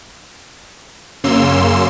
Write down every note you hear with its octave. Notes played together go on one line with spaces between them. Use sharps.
F#2 C#3 A#3 C#4 C6 E6